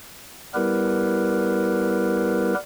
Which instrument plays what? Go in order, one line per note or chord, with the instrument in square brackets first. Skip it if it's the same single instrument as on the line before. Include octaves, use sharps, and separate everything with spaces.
[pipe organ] G3 B3 E4 G4 A#4 B4